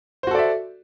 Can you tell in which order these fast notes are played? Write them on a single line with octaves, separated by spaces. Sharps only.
C5 F#4 A4 D5 E5